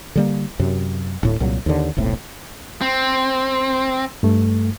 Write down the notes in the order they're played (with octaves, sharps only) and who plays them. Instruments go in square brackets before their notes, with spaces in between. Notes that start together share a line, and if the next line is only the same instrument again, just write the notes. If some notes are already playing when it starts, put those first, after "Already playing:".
[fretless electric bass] D3 G3 A#3
F#2 C3
D1 A2
C2 A#2 F#3
D#2 D3
E1 B1 A2 C3
[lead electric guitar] C4
[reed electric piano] G2 A3